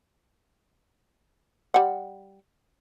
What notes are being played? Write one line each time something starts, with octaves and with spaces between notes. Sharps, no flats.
G3 F#5